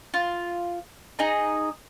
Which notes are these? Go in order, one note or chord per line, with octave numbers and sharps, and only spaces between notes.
F4
D#4 G#4 D#5 A#5